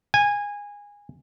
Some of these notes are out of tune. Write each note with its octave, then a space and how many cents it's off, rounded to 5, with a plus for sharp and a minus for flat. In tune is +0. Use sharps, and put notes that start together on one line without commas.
G#5 -20